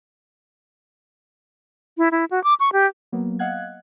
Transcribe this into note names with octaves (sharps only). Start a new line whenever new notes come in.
E4
E4
F#4
D6
C#6
G4
F#3 A#3 B3
D#5 F5 F#5 F#6 G#6